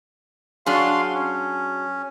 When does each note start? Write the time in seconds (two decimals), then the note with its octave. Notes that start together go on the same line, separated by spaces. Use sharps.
0.66 F#3 D4 G#4 F5 C6
1.15 C#4